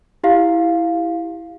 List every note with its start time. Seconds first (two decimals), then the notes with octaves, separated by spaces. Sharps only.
0.24 E4 G4 F5